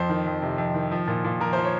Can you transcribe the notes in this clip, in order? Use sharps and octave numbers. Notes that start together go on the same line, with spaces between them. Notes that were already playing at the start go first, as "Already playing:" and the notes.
Already playing: F2 F3 C5
D#3
F2
C3
F2
D#3
F3
A#2
A#2
F3 A#4
F3 C5
C#5